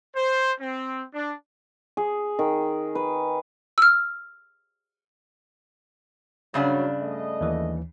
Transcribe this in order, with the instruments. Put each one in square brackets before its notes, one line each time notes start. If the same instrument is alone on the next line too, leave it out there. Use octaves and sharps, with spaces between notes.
[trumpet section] C5
C4
D4
[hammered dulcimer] G#4
D#3
B4
[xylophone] E6 F6
[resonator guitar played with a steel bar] G2 C#3 D4 [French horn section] F#3
[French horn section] A3 D#5
[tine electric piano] D#2 E3